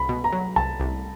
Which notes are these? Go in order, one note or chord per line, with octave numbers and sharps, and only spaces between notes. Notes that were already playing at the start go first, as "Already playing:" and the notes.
Already playing: C2 B5
B2
A#5
F#3
C2 A5
C2